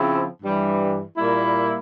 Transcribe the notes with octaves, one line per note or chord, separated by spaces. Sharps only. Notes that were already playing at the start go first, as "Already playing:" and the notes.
Already playing: C#3 F3 C4 E4
G2 E3 G3
A#2 G3 A#3 E4